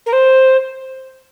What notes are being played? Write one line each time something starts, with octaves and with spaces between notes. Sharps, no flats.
A#4
C5